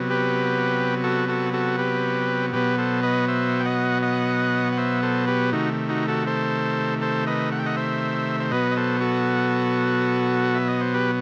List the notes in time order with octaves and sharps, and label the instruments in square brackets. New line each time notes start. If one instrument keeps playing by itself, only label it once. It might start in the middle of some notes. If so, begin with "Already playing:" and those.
Already playing: [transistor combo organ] C3 F#3 B3
G4 B4
F#4 A4
F#4 A4
F#4 A4
G4 B4
B2 F#3 B3 G4 B4
A4 C5
B4 D#5
C5 E5
G5
D#5 F#5
D#5 F#5
F#5
C5 E5
A4 C5
G4 B4
C3 D#3 A3 D#4 F#4
D#4 F#4
F#4 A4
A4 C5
A4 C5
B4 D#5
F#5
G5
D#5 F#5
C5 E5
C5
B2 F#3 B3 B4 D#5
D#5
A4 C5
F#4 A4
E5
D#5
C5
G4 B4